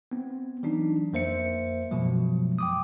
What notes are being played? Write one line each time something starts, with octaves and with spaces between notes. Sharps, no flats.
B3 C4
E3 F#3 D4 D#4
F2 A#3 C5 E5 C#7
F#2 B2 F3 F#3 G#3
G5 D6 D#6